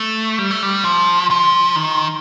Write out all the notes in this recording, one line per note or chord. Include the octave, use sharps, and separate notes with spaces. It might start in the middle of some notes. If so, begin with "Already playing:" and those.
Already playing: A3
G3
A3
G3
F3
F3
D#3